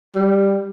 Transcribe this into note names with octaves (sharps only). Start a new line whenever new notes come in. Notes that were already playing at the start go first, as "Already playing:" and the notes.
G3